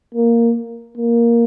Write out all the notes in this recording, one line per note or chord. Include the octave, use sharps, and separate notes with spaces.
A#3
A#3